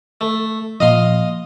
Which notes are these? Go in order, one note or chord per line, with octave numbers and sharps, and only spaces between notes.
A3
A#2 F3 D#5 F5 C6